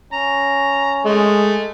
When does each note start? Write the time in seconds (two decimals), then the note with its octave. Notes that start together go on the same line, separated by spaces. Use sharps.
0.13 C#4 A#5
1.05 G#3 A3